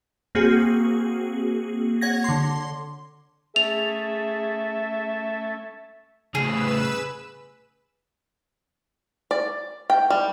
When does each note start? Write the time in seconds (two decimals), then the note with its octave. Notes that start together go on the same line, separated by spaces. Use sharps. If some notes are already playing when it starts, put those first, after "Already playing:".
0.35 A#3 C4 F#4 G#4
2.01 C#5 F#5 G#6 A#6
2.24 D3 C6
3.56 A3 C#4 G#4 A4 E5 F7
6.35 A2 C#3 G#4 B4 E6 E7
9.31 D5
9.90 G5
10.10 G3